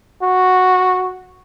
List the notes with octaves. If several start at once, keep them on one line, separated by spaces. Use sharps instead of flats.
F#4